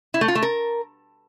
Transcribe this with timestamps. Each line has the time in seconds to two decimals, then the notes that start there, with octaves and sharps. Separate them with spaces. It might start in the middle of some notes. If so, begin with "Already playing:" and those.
0.14 E4
0.21 A3
0.28 F4
0.35 A3
0.43 A#4